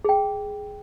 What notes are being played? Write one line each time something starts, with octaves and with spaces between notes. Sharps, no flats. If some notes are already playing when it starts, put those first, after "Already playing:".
G#4 G5